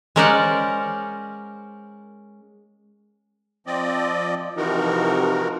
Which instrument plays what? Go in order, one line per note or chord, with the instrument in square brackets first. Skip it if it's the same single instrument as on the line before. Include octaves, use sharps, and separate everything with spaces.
[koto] G#3 C#4 A#4 C5 D5 F#5
[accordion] F3 C4 D5 D#5
C3 E3 F3 D#4 F#4 A#4